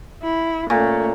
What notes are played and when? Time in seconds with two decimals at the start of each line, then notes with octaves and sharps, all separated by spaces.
0.23 E4
0.70 A#2 A3 C#4